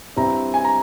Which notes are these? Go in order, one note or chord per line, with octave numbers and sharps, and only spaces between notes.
G2 G3 C4 E4 A#5
G#5
A#5